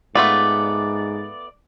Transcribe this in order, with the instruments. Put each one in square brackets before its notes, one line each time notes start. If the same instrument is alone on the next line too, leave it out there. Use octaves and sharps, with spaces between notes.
[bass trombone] G#2 [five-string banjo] A3 B3 F4 [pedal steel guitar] D5